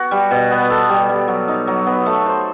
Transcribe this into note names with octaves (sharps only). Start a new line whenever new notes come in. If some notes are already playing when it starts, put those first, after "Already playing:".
Already playing: B3 F#4
G3
B2
B3
A4
G3
G3
F#3
D#4
F#3
B3
A3
C5